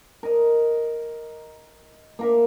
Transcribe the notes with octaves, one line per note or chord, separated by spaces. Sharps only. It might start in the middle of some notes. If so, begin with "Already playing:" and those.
A#4 D#5
A#3 A#4 E5